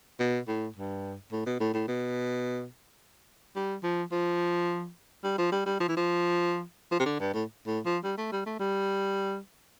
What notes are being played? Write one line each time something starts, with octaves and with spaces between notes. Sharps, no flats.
B2
A2
G2
A2
B2
A2
A2
B2
G3
F3
F3
G3
F3
G3
G3
F3
E3
F3
F3
C3
D3
G2
A2
A2
F3
G3
A3
G3
A3
G3